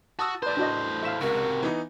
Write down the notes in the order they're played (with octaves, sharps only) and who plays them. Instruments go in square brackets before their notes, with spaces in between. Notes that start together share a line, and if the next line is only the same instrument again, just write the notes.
[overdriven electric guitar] F#4 [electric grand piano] A5 D#6 E6
[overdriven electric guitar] A2 C5 [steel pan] B4 D5
[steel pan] D4 F#4 D#5
[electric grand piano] A3 E7 [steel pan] E5 F5
[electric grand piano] C#2 [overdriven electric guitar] C3 F#4 [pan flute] A#4
[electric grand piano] E3 B3 D#4